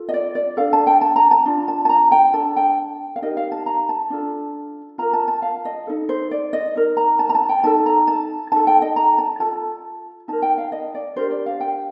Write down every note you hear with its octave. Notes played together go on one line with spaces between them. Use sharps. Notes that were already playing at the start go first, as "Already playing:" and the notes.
Already playing: F4 A4
D#5
D5
D5
D4 A4 F5
A5
G5
A5
A#5
A5
D4 F4
A5
A5
A#5
G5
D4 A4 A5
G5
F5
D#4 G4 A#4 D#5
F5
A5
A#5
A5
D4 F4 A4
F4 A#4 A#5
A5
A5
F5
D#5
D#4 A4
C5
D5
D#5
D#4 A#4
A#5
A5
A#5
A5
G5
D#4 A4 A5
A#5
A5
D#4 A4 A5
G5
D#5
A#5
A5
F4 A4 A5
D#4 A#4 A5
G5
F5
D#5
D5
D4 G4 A#4 C5
D5
F5
G5